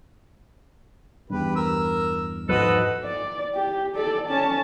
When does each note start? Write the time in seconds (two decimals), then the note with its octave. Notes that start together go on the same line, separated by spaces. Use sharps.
1.30 E2 G2 G4 B4
1.56 A#4 E6
2.49 G#2 F3 F#4 A4 B4 D#5
3.04 D5
3.55 G4
3.95 A4 D5
4.28 C#4 A5